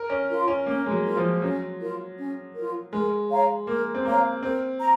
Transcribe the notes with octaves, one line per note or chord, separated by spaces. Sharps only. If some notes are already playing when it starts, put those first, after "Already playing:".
Already playing: A#4
C#4
F4 A#4
C#4
A#3 C#4
G#3
F#3
F4 A#4
F3
F#3 C#4
F4 A#4
C#4
F4 A#4
G#3 A#4
C#5 F5 A#5
A#3 A#4
C4
A#3 C#5 F5 A#5
C4 A#4
A#5